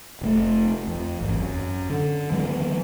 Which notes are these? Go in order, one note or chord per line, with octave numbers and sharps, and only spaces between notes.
F1 C3 A3
F2
G#1 E2
F#2
D3
D#3 F3 G#3 B3